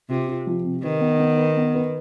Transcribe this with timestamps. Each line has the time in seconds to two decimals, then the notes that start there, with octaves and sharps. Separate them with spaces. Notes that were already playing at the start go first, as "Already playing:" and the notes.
0.10 C3 F4
0.28 F4
0.47 F3
0.64 C3
0.83 D#3 B4
1.01 B3
1.19 B3
1.37 B4
1.57 B3
1.75 B4